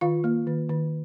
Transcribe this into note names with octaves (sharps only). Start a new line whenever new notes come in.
D#3 F4 F5
A#3
D#3
D#3